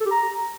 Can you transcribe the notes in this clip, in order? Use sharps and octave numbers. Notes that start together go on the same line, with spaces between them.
A4
G4
A#5